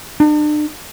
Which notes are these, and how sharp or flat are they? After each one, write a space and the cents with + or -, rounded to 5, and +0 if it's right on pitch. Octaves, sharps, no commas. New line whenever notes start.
D4 +40